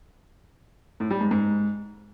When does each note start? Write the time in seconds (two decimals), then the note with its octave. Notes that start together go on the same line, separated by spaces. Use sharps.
1.00 A2
1.10 G3
1.21 G#2
1.31 G#2